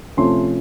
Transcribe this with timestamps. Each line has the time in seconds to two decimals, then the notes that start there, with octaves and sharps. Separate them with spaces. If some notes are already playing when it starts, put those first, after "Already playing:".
0.17 C3 F3 A3 C#4 C6